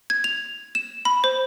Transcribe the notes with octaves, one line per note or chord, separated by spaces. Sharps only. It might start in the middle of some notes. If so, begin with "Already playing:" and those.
G#6
F7
E7
B5
C5